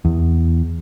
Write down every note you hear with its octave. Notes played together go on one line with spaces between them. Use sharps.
E2